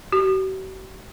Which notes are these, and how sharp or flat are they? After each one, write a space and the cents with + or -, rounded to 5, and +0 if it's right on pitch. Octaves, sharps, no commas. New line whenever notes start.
F#4 +45